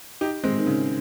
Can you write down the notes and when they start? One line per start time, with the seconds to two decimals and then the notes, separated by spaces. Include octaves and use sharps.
0.21 D#4 G4
0.44 G#3 C4
0.58 D#3
0.66 C#3